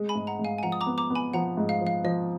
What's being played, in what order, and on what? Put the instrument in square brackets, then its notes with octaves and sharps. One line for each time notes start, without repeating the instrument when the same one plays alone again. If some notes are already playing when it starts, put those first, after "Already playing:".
Already playing: [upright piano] G#3
[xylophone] G#5 B5
[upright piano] G#2
[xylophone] F#5 A#5
[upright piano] G#2
[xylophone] F5 G#5
G#5
[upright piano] F3 [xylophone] F#5 A#5
[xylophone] D#6
A#5 D6
[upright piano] B3
[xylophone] A#5 D6
[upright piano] B3
[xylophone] G#5 B5
[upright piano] F3 [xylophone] F#5 A#5
[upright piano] G#2
[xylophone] F5
[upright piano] F3
[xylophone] F5
[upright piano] F3 [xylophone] D#5